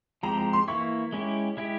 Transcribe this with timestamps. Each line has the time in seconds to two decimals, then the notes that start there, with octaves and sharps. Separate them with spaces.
0.23 F3 G#3 C4 G4 A#5
0.38 A#5
0.53 C6
0.68 E3 A#3 E4 C#6
1.12 G#3 C#4 E4 G4
1.57 G#3 E4 G4